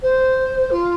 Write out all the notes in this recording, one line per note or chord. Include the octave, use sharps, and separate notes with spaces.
C5
F4